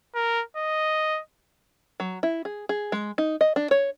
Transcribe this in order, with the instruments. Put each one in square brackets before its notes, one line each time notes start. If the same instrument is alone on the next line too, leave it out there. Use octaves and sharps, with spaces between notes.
[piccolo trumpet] A#4
D#5
[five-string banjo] F#3
E4
G#4
G#4
G#3
D#4
D#5
D4
C#5